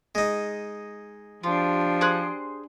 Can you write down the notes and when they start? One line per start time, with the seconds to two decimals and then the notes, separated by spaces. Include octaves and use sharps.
0.15 G#3 D#4
1.43 F3 D4 F4 G4
2.01 G#4 C5 F#6